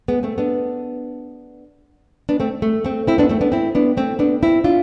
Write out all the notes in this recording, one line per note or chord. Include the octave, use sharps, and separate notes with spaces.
G#3 B3
A3 C4
B3 D4
B3 D4
A3 C4
A3
A3 C4
C4 E4
B3 D4
A3 C4
B3 D4
C4 E4
B3 D4
A3 C4
B3 D4
C4 E4
D4 F4